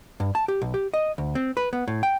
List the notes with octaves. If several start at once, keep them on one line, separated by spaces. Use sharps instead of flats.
G2
A5
G4
B1
G4
D#5
D2
C4
B4
B3
A2
G5